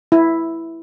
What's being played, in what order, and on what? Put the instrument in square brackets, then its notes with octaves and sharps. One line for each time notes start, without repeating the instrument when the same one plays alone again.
[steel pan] E4